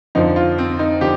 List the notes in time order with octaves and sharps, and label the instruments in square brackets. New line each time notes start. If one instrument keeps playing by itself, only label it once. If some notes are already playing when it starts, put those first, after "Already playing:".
[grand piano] F2 D3 F3 D#4
F4
C4
D#4
D3 F3 G4